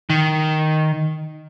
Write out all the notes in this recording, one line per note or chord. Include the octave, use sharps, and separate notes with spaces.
D#3